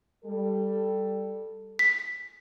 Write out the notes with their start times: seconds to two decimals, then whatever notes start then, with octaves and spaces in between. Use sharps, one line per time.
0.25 G3 A4
1.79 B6